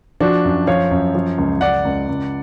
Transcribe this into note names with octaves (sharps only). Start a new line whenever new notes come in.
F3 D4 F#4
F#2
F3 C#5 F5
F#2
F3
C#2
C#2 D5 F#5
C#2
C#2